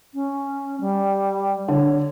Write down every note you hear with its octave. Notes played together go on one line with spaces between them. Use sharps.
C#4
G3
D3 C#5